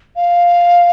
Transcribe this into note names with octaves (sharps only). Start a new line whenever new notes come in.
F5